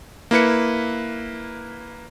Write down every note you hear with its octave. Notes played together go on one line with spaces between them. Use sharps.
A#3 E4 B4 C#7